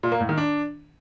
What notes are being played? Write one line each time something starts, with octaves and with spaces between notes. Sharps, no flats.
A#2
A#3
A2
D#3
D4